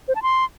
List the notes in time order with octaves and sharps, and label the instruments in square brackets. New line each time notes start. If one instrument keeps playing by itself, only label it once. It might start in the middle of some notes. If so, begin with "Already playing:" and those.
[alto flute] C5
A5
C6